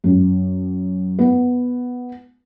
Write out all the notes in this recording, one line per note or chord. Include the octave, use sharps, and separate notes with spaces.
F#2
B3